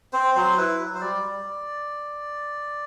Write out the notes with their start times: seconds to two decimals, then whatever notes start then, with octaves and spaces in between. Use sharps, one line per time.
0.13 C4 C5
0.35 F#3 C5
0.57 E4 B4
0.79 F#3
0.94 C5
1.01 G3 D5
1.23 G3